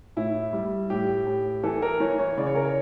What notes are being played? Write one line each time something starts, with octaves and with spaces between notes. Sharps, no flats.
A2 E4
G3
A2 G4
A2
E3 A4
A#4
E3 C#5
C#5
C#3 D5
C#5
A#4
C#5